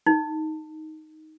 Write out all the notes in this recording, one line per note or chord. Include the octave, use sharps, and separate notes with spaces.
D#4